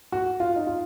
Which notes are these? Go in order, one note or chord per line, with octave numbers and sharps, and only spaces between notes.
F#4
F4
D#4
F4